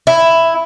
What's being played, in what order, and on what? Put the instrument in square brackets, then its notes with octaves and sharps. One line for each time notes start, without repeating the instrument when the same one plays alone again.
[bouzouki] E4